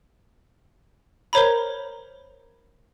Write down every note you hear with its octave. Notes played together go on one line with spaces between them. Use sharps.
A#4 C5 C#5 A#5 B5